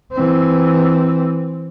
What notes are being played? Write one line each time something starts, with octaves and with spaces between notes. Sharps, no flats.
E3 C4